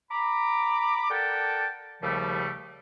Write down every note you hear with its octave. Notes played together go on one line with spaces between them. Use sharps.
A#5 B5 D6
A4 A#4 D5 F#5 G5 A5
D#2 C#3 F3 G3 A3